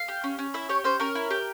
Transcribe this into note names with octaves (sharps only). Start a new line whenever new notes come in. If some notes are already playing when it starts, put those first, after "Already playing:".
Already playing: F5
G4
C#4
C#4
E4 E5
G4 C#5
C#4 C5
C#4 A#4
E4
G4